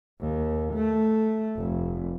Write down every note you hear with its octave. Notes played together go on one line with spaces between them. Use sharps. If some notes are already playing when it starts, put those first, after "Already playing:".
D#2
A3
F1